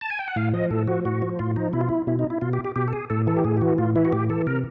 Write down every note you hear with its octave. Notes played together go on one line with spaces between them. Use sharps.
A5
G#5
G5
F#5
A2 F5
F3 D#5
A2 A4
F3 F#4
A2 F#4
F3
A2 F4
F3 D#4
B2 E4
F4
E4
B2 E4
D#4
E4
B2 F4
G4
G4
B2 G4
A4
G#4
A2 A4
E3 A4
G4
A2 G#4
G4
E3 F#4
A2 F4
E3 E4
F#4
A2 G4
E3 A4
C3 A#4